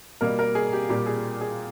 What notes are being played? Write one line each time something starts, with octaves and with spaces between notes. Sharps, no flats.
B2 G3 A#3 A#4
A#4
G#4
G4
A#2 G3 A#3 G4
G#4
G#4